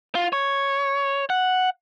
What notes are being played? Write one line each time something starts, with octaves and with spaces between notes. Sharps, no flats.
F4
C#5
F#5